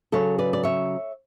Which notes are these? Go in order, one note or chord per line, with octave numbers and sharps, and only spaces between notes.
C#3 F#3 A4 C#5
B4 D5
D5
C#5 E5